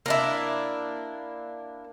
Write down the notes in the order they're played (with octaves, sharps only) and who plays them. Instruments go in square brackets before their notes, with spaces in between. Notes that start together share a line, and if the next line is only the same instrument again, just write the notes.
[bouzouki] A#3 D4 E4